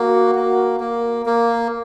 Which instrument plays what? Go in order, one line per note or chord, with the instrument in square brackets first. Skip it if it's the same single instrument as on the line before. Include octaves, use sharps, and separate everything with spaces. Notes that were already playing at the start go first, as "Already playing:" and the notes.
Already playing: [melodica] A#3 [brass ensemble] F#4
[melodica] A#3
A#3
A#3